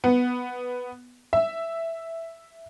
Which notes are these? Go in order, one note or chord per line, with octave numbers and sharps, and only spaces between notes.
B3
E5